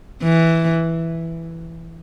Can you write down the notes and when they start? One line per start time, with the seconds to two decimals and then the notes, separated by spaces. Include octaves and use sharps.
0.22 E3